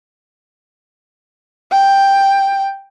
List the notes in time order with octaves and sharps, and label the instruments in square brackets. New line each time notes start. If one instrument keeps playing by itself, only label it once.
[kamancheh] G5